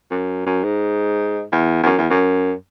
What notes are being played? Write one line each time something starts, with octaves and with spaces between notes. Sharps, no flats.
F#2
F#2
G#2
E2
E2
F#2
E2
F#2